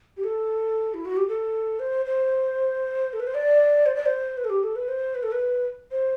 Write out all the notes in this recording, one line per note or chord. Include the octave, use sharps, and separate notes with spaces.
G4
A4
E4
F#4
G4
A4
C5
C5
A4
B4
C5
D5
C5
D5
C5
B4
A4
G4
A4
B4
C5
B4
A4
B4
C5